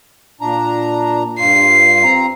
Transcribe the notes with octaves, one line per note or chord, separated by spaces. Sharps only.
A#2 D4 A#5
G2 F4 C7
C4 A#5